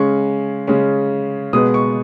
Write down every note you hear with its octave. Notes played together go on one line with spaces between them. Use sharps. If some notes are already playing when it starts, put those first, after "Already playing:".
Already playing: C#3 G#3 C#4 C#6
C#3 G#3 C#4
B2 G#3 B3 D#6
C#6